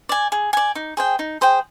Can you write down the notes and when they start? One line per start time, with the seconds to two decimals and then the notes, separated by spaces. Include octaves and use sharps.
0.09 D5 G#5
0.32 G#4
0.53 D5 G#5
0.75 D#4
0.97 G#4 C5 G5
1.19 D#4
1.41 G#4 C5 G5